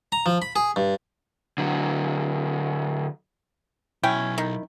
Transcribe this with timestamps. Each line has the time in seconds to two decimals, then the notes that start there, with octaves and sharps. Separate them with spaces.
0.12 A#5
0.26 F3
0.42 B5
0.56 G#4
0.76 G2
1.58 D3 F#3
4.03 B1 C#4 E4 G5
4.38 D#3